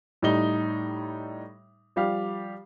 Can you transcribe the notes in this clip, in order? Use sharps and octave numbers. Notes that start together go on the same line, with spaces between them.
A2 G3 D#4 G7
F3 G3 G4 F5